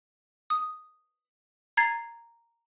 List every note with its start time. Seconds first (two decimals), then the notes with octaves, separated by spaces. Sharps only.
0.50 D#6
1.77 A#5 G#6 A6 C7